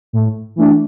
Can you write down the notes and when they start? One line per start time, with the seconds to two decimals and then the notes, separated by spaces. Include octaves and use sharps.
0.13 A2
0.56 E3 A3 D4